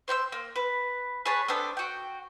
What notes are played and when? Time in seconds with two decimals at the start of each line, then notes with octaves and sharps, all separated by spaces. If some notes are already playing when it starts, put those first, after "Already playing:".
0.08 C5 G5 A#5 E6
0.32 A#3
0.56 B4
1.26 G#4 B4 C#5 A5
1.48 B3 C4 D4 A4
1.77 F#4 G5